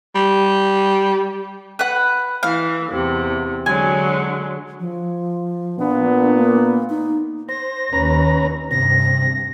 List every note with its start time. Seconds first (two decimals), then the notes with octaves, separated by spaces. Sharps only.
0.16 G3
1.79 B4 F#5
2.43 E3 F5
2.92 E2 C3
3.66 D3 F#3 G#3 G#5
4.80 F3
5.79 A#2 B3 D4
6.37 A#3
6.90 D#4
7.49 C5 A#6
7.93 D#2 C#4 B4 A#5
8.71 G2 C3 A#6